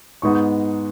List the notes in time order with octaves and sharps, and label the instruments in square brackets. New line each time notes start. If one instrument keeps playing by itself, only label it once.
[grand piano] G#2 G#3 B3 D#4 C#6